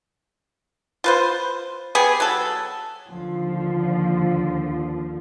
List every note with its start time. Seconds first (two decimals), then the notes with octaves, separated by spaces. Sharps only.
1.04 F4 B4 C5
1.95 B3 G4 G#4
2.20 F#3 A4
3.10 D#2 D3 F3